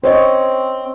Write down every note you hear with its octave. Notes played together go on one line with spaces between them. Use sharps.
C4 C5 C#5 D#5